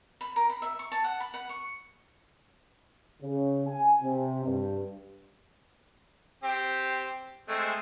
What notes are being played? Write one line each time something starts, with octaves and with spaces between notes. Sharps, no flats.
B5
A#4
B5
E5
C#6
A5
F#5
B5
F#5
C#6
C#3
G#5
C3
G2
C4 G4
G#3 A3 C4